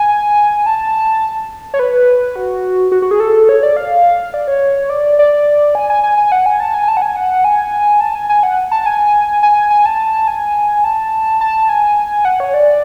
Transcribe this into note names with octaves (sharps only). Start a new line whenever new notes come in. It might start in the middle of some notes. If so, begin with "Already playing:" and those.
Already playing: G#5
A5
C#5
B4
F#4
F#4
F#4
G#4
A4
C#5
D5
F5
D5
C#5
D5
D5
G#5
G#5
G#5
G#5
F#5
G#5
A5
G#5
A5
F#5
G#5
F#5
G#5
A5
G#5
G#5
F#5
A5
G#5
G#5
G#5
A5
G#5
A5
A5
G#5
F#5
C#5
D5